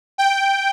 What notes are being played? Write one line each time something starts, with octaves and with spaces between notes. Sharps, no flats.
G5